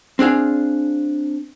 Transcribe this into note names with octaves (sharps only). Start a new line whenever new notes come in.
C4 D4 G#4 F5